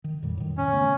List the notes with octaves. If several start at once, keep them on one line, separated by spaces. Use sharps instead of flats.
D#3
F2 A#2 G3
A2 D#3
C#4
C#3 A3 B3